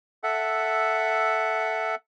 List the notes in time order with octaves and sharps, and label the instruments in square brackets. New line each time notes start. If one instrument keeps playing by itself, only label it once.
[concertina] A4 E5 F#5